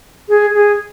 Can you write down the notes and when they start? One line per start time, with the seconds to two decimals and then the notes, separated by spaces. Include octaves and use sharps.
0.29 G#4
0.54 G#4